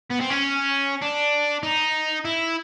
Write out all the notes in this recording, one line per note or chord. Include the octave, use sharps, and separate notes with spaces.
B3
C4
C#4
D4
D#4
E4